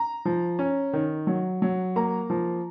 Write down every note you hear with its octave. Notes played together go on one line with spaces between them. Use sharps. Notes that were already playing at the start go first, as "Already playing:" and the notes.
Already playing: A#5
F3
C#4
D#3
F#3
F#3
A#3 A#5
F3